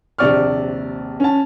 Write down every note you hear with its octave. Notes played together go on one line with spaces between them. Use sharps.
A#1 D#2 C3 D5 C#6 F6
C#4 A5